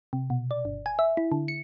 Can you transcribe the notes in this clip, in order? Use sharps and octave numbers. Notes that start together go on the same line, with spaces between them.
C3
B2
D5
G1
G#5
E5
E4
D3
C#7